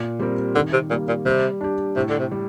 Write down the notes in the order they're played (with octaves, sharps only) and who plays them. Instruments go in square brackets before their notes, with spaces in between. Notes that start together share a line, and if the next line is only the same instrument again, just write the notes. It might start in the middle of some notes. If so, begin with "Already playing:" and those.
Already playing: [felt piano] A#2
G3 C4 G4 A#4
[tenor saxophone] D3 [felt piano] D#3
[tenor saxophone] C3
[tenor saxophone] A#2 [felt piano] G3 A#3
[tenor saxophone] A#2
[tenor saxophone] C3 [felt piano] G3
[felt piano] D4 G4
[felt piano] A2 [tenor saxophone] C3
[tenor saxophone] D3
C3
[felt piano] G3